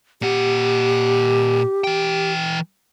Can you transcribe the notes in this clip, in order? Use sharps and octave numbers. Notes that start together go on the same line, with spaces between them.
A#2 G4 F#5
E3 G5